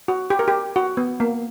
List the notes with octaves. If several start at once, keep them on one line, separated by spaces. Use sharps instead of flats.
F#4
G4
A#4
G4
F#4
B3
A#3